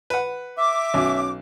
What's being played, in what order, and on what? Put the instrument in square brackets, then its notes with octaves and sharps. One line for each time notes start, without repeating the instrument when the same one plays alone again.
[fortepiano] B4 F#5
[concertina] E5 [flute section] D6
[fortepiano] B1 [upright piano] C#4 F#4